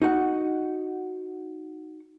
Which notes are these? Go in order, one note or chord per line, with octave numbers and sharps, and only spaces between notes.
D#4 F#4 F#5